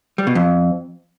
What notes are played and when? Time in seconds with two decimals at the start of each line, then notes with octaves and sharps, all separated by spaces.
0.18 G3
0.27 B2
0.35 F2